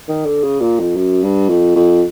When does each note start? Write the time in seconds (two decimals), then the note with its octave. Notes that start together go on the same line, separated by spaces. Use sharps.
0.08 D#3
0.26 D3
0.43 C#3
0.61 A#2
0.79 F2
0.96 F#2
1.23 G2
1.49 F2
1.76 F2